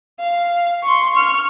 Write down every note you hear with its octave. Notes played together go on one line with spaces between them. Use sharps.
F5
C6 C#6
C#6 F6